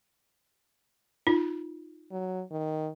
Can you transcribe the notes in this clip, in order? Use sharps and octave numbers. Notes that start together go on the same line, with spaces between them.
D#4 F4
F#3
D#3